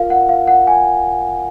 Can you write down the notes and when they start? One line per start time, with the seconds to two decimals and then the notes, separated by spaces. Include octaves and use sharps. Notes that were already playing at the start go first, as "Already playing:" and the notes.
Already playing: F4 A#4 F5
0.10 F#5
0.29 F5
0.47 F#5
0.67 G#5